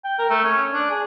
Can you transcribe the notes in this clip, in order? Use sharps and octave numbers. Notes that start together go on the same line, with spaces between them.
G5
A#4
A3
C#4
D4
G#4